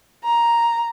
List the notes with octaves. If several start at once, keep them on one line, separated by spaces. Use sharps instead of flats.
A#5